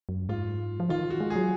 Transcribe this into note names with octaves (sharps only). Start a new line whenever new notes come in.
F#2
G#2 F4
F3
D#3 F4
F#4
G#3
G#4
F#3